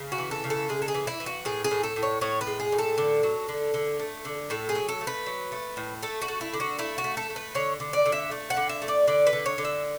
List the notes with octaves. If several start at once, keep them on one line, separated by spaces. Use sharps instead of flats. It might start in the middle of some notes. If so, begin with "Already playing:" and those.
Already playing: C#3
F#4
E3
A4
C#3
A4
G#3 G#4
A4
G#4
E3
E4
E3
F#4
A2 G#4
G#4
A2
A4
A2
C#5
A2 C#5
B4
G#3
G#4
A2
A4
D3
F#3
D3
D3
A3
D3
A2 A4
G#4
F#3
A4
A3
B4
F#3
A3
A2
A3 A4
F#4
A3
E4
D3
F#4
A3 E4
F#4
A3
A4
A3
B4
D3 C#5
D3
D5
D3
E5
A3
F#5
D3
E5
A3
D5
D3 D5
B4
D3
C#5
D3
E5